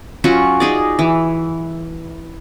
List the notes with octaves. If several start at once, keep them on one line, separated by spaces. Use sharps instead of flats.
F#3 C#4 F4 F#4
D#4 G#4 D5
E3